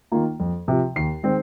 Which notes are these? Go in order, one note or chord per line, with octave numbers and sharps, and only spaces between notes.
D#3 A#3 F4
F2
C3 F3
D#2 C7
D#3 G#3 C4